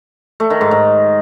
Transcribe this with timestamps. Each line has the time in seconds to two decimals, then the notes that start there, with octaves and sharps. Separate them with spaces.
0.40 A3
0.50 D#3
0.61 G#2
0.71 G#2